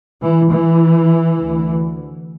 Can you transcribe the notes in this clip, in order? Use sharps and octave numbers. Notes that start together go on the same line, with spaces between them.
E3
E3
D2